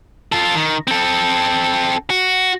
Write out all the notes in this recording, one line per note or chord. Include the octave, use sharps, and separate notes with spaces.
F4 A4
D#3
C4 A4
F#4